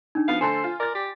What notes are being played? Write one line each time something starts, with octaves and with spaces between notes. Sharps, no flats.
D4 D#4
F3 B3 F#4 F5
D3 A3 A4 C5 G#5 C6
F4
A#4 D5 A6
G4